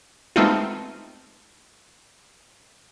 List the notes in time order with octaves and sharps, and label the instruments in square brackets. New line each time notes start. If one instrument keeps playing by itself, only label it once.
[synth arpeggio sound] G#3 A3 B3 C4 D#4 F4